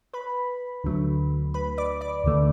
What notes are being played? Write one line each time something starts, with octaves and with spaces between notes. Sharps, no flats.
B4 B5
D2 D3 F#3 A3
B4 B5
D5 D6
D5 D6
D2 D3 A3